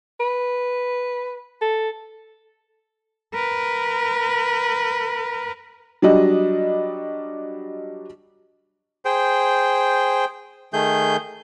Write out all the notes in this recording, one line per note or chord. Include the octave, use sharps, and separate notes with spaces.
B4
A4
A#4 B4
F#3 G3 D4 D#5
G#4 C5 G5
D#3 A3 G#4 G6